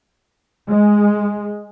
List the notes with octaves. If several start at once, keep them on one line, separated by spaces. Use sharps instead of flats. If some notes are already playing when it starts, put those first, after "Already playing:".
G#3